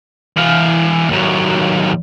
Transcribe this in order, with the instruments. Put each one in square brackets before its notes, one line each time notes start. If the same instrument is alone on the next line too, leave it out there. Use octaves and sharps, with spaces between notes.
[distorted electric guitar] E3 F5
D#2 F#3